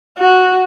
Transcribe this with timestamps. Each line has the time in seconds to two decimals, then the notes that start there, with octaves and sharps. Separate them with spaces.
0.19 F#4